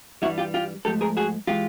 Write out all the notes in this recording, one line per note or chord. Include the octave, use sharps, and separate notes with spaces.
G2 E3 G3 E4 F#4
F4 G4
F4 G4
G#2 F3 A3 G4 A4
G#4 A#4
F#4 G#4
E3 G#3 F4 G4